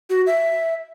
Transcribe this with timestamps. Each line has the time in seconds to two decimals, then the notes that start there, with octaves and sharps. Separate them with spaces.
0.10 F#4
0.27 E5